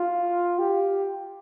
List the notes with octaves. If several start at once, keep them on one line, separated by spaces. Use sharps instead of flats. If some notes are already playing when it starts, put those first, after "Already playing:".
Already playing: F4
G4